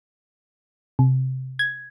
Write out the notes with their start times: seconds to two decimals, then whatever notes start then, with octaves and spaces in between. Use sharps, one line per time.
0.99 C3
1.59 G#6